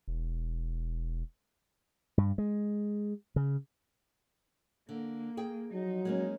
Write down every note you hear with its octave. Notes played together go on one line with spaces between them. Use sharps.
E1
G2
G#3
C#3
D3 A#3
G#4 G5
F3 F#3 D#4
G#3 A#3 C#4